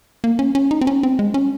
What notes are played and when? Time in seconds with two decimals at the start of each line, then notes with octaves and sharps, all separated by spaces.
0.24 A#3
0.39 C#4
0.55 C#4
0.71 D#4
0.81 C4
0.87 C#4
1.03 C4
1.19 G#3
1.34 C#4